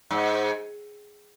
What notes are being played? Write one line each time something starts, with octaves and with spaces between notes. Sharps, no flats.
G#2